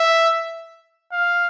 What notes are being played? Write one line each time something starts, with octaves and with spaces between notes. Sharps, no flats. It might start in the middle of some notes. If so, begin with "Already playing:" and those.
Already playing: E5
F5